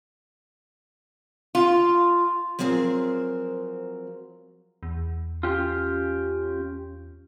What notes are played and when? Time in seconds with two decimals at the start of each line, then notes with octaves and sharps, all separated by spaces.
1.55 F4
2.59 F3 F#3 C4 G#4 A#4
4.83 E2
5.43 C#4 F4 G4